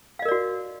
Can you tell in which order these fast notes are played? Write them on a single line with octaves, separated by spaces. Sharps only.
F5 D#5 A#4 D5 F#4